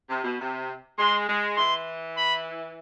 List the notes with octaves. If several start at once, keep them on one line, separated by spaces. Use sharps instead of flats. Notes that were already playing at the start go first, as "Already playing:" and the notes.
C3
B2
C3
G#3 C6
G#3
E3 C6
B5